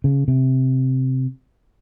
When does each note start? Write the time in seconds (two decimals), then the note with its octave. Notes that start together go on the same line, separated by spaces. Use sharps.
0.04 C#3
0.28 C3